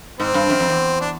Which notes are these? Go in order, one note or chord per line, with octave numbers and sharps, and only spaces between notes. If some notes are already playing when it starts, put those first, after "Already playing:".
G#2 C4
G2
F#2
F2
E2
D4